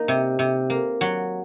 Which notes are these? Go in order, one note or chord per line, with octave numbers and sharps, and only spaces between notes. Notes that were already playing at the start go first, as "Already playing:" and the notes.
Already playing: A#3 D#4
C3
C3
A#3
F#3